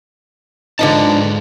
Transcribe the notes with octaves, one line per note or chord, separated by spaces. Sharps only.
G#2 D3 F3 D#4 B4 A5